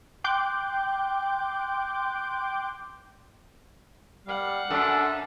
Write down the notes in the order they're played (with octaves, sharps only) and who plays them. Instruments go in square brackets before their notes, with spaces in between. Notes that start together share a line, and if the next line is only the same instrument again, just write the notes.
[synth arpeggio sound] G5 C6 D6 F#6 G6
[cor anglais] G3 [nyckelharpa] F5 F#5
[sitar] F#2 [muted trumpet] D4 [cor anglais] A4